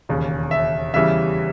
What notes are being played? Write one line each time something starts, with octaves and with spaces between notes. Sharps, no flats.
E1 D#2 C#3
E5
E2 C#3 E3 G3 E5